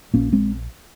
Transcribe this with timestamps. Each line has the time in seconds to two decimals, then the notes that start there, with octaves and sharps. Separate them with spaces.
0.14 A#1 A#2 A#3 C#4
0.32 G#3 C4